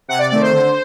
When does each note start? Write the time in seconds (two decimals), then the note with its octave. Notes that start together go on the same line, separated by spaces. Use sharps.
0.08 C3 F#5
0.19 D5
0.30 D#3 A3 C4 D5
0.42 C5
0.52 D3